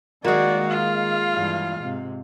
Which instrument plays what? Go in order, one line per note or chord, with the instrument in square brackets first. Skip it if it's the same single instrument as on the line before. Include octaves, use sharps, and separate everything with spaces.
[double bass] D#3 [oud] G#3 A#3 [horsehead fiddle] F#4 D5
[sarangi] F4 [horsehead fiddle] F5
[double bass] G2 E3
G#2 C3